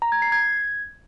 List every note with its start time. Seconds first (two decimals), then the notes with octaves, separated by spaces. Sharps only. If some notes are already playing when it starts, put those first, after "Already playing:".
0.02 A#5
0.12 G#6
0.22 C7
0.32 G#6